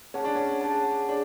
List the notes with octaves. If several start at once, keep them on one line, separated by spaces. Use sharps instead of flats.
C#4 G#4 C#5 F#5 A5
D4
C#4
G#4 C#5 F#5 A5
D4 G#4 C#5